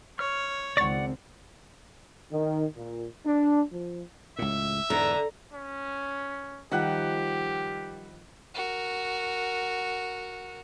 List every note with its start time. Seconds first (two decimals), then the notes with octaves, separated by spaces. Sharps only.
0.19 C#5 F6
0.77 C#2 D#3 C4 D5 F#5 C#6 A6
2.31 D#3
2.77 A#2
3.25 D4
3.72 F3
4.39 C#2 A2 E5
4.90 E2 G#2 D3 A#5
5.53 C#4
6.72 D#3 F3 G3 G4 F#5 F#6
8.54 F#4 A#4